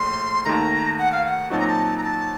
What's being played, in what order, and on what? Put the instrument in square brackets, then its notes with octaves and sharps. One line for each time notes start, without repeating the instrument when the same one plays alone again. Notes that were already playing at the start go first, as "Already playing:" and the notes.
Already playing: [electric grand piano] A#1 A2 A3 [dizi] C6
[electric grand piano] D#2 D#3 A3 [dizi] A#5
[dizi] F#5
F5
F#5
[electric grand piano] A#2 F#3 C4 D#4 F#4 [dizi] A5
[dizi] A#5
A5
A#5
A5